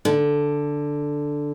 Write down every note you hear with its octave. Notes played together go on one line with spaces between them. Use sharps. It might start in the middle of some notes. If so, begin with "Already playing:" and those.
D3